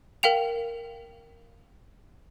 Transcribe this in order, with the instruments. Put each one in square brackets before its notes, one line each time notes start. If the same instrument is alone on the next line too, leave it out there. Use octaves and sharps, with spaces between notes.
[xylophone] A#4 F5 G5 F7